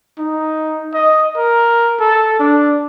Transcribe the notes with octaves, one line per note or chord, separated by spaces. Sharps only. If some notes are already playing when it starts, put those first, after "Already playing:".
D#4
D#5
A#4
A4
D4